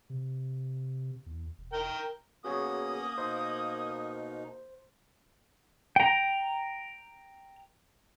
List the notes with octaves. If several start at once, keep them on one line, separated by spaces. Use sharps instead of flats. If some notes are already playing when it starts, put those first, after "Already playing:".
C3
E2
E1
A#4 G5
A#3 B3 C#4 F#4 G#4 C#5 D#6
B2 D#4 C5
G5 A#5